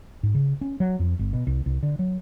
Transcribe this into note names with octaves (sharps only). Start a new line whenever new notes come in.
G#2
C#3
C#4
F#3
F2
G1
B2
C2
C2
D3
F#3